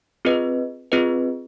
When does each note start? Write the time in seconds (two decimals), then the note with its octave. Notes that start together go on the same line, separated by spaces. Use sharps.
0.25 C4 F4 G#4 B4 D#5
0.92 C4 F4 G#4 B4 D#5